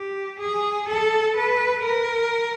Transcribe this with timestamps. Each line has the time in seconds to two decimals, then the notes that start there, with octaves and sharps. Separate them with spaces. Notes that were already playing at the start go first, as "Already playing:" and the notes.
Already playing: G4
0.40 G#4
0.89 A4
1.37 B4
1.85 A#4